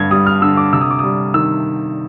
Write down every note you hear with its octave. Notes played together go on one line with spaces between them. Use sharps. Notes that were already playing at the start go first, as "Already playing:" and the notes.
Already playing: G2 D3 G#6
G3 D#6
F6
D3 E6
D6
C3 E6
D#6
D6
G3 D#6
D#3 E6